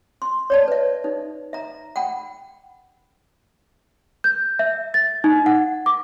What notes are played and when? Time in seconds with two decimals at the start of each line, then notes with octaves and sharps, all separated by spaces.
0.22 C6
0.50 C#5 D5 A5
0.68 B4 E5
1.04 D#4
1.53 E5 A#5
1.96 F#5 G5 B5
4.24 G6
4.59 E5
4.94 A6
5.24 D#4
5.46 F#5
5.86 D6